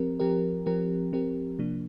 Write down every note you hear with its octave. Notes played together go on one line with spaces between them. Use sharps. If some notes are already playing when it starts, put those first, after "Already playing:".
Already playing: F3 C4 G4 A#4
F3 C4 G4 A#4
F3 C4 G4 A#4
F3 C4 G4 A#4
C3 F3 A#3 D4